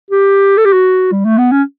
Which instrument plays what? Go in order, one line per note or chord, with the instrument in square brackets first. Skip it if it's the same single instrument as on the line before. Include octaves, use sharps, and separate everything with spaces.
[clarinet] G4
A4
G4
F#4
G3
A3
B3
C#4